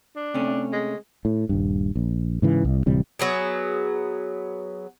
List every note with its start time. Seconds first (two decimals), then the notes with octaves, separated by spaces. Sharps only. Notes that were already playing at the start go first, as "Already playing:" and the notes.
0.16 D4
0.34 C3 A3 C#4
0.73 G#3
1.25 A2
1.49 D#1 G2
1.96 A#1
2.42 G#2 C#3 E3
2.65 C2
2.86 D1 C3 E3 G3
3.19 F#3 B3 G#4